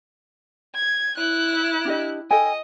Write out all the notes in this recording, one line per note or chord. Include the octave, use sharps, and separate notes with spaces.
G#6
E4 F#6
D4 G4 D#5
A4 D#5 G5 G#5